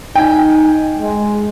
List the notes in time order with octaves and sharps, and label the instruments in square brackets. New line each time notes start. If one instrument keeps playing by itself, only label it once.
[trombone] D#4 [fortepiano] G5 G#5
[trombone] G#3